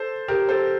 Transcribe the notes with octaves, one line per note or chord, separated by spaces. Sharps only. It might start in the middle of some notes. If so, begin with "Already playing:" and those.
Already playing: A4 C5
G4 A#4
A4 C5